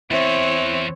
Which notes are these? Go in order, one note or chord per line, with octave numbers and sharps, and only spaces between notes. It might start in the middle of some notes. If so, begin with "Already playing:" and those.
E2 C4 E4 C#5